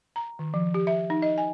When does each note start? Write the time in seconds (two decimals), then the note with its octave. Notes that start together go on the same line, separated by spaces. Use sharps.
0.16 A#5
0.39 D#3
0.54 F3
0.74 G4
0.87 E5
1.10 D#4
1.22 D#5
1.38 G#5